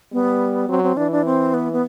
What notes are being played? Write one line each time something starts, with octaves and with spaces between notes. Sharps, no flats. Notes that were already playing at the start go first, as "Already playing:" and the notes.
G3 B3
F#3 C4
C4
E3 D4
D4
C4
B3
B3